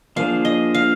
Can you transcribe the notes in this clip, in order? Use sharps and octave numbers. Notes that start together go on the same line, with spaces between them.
F3 A#3 D4 G#4 C5 F5
D#5
F5